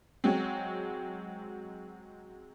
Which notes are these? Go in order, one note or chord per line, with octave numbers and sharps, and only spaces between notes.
F#3 G#3 C4